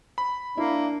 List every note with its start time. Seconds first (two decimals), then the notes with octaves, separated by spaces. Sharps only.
0.18 B5
0.57 A#3 D4 E4